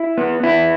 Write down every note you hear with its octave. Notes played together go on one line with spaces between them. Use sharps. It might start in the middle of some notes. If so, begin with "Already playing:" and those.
Already playing: E4
B3
B3 E4